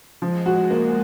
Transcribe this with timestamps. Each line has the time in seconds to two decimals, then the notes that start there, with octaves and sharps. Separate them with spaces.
0.21 F3 G#3
0.46 F#4
0.70 A#3